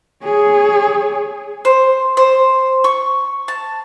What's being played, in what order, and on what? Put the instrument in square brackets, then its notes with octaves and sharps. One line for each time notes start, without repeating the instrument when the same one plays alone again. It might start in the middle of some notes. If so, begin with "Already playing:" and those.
[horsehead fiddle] G#4 C#5
[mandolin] C5
C5
C#6
A5